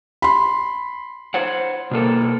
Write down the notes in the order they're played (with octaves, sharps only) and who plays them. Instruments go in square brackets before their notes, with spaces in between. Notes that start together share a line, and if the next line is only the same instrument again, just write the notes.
[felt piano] B5 C6
[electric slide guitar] C5 C#5 F#5
B2 A#3 A4